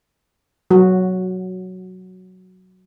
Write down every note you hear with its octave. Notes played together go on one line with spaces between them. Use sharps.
F#3 F#4